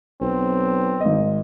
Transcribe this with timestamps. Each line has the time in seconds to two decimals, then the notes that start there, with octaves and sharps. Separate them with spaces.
0.21 B1 C4
1.01 G#1 D#5